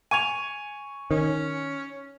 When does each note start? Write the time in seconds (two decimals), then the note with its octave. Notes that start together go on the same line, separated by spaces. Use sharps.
0.11 G#5 C#6 G#6 D#7 F7
1.11 D#3 C#4